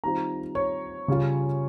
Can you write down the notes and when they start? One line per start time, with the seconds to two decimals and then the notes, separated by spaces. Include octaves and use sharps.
0.04 D#3 G3 C4 F4 A#5
0.55 C#5
1.08 C#3 G3 C#4 F4